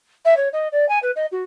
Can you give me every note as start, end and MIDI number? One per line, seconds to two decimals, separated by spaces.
0.25 0.37 76
0.37 0.49 73
0.53 0.68 75
0.72 0.88 74
0.89 0.99 80
1.03 1.11 71
1.16 1.26 75
1.32 1.44 66